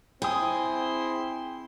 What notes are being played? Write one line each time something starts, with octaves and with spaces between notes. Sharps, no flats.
C4 E4 G#4 G5 C6 D#6